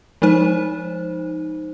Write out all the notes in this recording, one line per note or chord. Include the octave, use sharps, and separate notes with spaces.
F3 G#3 D#4 C5